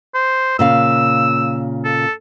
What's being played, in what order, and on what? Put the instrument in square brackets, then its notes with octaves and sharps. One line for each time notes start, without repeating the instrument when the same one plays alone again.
[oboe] C5
[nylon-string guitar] A#2 C#3 F5 [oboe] E6
[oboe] A4